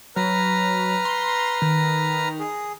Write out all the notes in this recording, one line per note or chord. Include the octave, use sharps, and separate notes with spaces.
F#3 B4 A#5 F6
C6
D#3
G#4